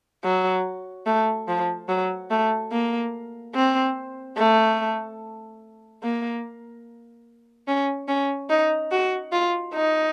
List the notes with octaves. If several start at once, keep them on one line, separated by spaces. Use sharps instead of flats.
F#3
A3
F3
F#3
A3
A#3
C4
A3
A#3
C#4
C#4
D#4
F#4
F4
D#4